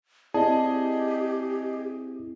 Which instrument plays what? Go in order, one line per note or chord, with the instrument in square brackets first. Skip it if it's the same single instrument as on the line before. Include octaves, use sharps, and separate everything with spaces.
[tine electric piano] C4 E4 [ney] G4 [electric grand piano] G#4 D#5 [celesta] D5 A5